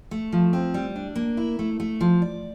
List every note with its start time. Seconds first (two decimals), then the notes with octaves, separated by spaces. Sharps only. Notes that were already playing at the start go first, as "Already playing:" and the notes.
0.11 A3
0.33 F3
0.53 C4
0.74 G3
0.96 D4
1.16 A#3
1.37 E4
1.59 A3
1.80 A3
2.01 F3
2.22 D5